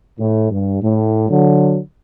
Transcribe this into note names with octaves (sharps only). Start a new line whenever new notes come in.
A2
G2
A2
D3 F#3